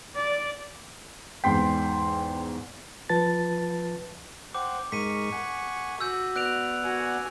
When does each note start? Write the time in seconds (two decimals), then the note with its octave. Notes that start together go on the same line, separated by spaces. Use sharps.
0.15 D5
1.44 E2 G#2 G5 C6 B6
3.09 F3 F4 B4 A5 A6
4.54 C5 F#5 G5 D6
4.92 G#2 G#3 A#4 C#6 B6 D#7
5.32 F#5 G#5
6.01 F#4 E6 G6
6.36 B3 D5 F#5 F#6 D7 F7
6.84 F#4 G#5